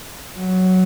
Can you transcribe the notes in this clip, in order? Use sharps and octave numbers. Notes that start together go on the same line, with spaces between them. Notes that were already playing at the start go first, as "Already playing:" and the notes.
F#3